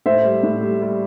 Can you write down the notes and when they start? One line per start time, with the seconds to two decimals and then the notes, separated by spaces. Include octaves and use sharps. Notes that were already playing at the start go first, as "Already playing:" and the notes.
0.06 A2 C5 E5
0.25 G3
0.43 A2
0.63 G3
0.82 G3